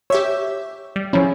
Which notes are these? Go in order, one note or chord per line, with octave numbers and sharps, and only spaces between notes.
G4 C#5 E5 E6
G3
F3 C#4 E4